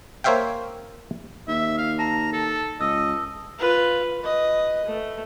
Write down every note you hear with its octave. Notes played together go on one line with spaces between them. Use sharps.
A#3 C5 C#5 E5 F5 G5
D#2 E5
F5
A5 A#5
A4
C#2 D#5 E6
F4 B4
B4 D#5
A3